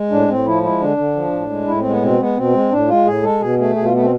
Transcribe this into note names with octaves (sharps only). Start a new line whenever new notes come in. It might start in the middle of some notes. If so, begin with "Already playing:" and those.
Already playing: G#3
A2 D4
A2 C4
F3 E4
G#3 E4
D3 D4
D3
F3
A2
G#3
A2 E4
C4
G#3
B3
B2 C4
G#3 B3
B2 C4
G#3
A2 D4
G#3 F4
A2 G#4
G#3 A4
B2 G#4
A3 G#4
B2 G#4
F4
A3 B3
C4